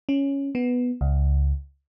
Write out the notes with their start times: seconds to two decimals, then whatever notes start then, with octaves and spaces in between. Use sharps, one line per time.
0.09 C#4
0.55 B3
1.01 C#2